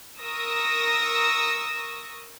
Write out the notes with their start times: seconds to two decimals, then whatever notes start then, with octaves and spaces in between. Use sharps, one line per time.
0.21 A#4 C#6 D#6 E6 A#6